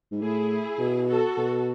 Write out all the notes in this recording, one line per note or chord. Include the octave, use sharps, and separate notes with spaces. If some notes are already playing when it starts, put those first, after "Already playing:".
G#2
A2 E4 G#4
B2
F#4 A4
B2